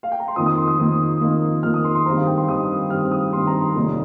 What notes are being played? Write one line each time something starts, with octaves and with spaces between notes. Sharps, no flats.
F5
G5
A#5
C6
F2 D#3 A#3 D#6
D#6
C6
D#6
F2 D#3 A#3
F2 D#3 A#3
F2 D#3 A#3 F6
D#6
C6
C6
G2 D#3 C4 A#5
F5
G5
C6
G2 D#3 C4 D#6
G2 D#3 C4 F6
D#6
G2 D#3 C4 C6
A#5
C6
F1 D#2 D#3